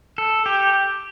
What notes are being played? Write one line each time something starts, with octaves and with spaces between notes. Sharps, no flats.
A4
G4